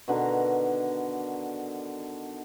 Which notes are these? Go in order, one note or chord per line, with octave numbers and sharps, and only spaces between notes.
B2 D3 D#3 A#5